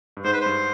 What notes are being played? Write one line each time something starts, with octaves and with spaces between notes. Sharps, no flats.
G2
G#2 C5
B4
G2 C5